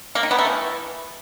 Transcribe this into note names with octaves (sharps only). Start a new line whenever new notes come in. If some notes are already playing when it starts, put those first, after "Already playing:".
A#3
D#3
B3
A3
E3